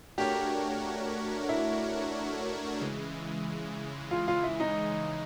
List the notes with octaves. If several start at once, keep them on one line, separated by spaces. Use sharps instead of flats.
A3 D4 F#4 G4 A#4 C#5
E4
C#3 E3 G#3
F4
F4
E4
D#4